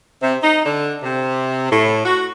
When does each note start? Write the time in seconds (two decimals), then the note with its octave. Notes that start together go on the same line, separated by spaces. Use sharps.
0.22 C3
0.43 D#4
0.65 D3
1.03 C3
1.71 A2
2.05 F#4